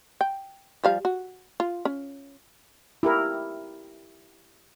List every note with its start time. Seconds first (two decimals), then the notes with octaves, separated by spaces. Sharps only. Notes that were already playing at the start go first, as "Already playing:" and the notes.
0.21 G5
0.84 F3 G3 F5
1.05 F#4
1.60 F4
1.85 C#4
3.03 E4 G4 A#4